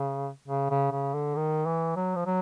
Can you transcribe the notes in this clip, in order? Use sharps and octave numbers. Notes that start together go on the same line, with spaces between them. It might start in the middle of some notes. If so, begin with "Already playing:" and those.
Already playing: C#3
C#3
C#3
C#3
D3
D#3
E3
F#3
F3
F#3